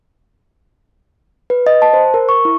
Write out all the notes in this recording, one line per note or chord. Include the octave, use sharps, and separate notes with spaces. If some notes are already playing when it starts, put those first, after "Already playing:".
B4
D#5
A5
C5
A#4
C#6
E4